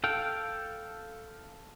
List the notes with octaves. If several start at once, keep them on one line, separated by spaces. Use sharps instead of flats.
A4 F5 G5